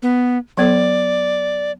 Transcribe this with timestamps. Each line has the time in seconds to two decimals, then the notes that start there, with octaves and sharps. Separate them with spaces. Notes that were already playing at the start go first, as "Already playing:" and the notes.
0.02 B3
0.57 F#3 B3 A4 D5